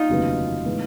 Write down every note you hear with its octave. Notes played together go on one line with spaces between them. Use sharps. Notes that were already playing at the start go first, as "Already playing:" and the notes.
Already playing: D#4 F4
F1 D#2 C#3 F#3 B3
A2 E3 G#3 B3